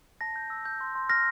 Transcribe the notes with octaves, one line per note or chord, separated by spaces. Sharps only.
A5 A#6
G6
E6
G6
C6
C6
F6 A#6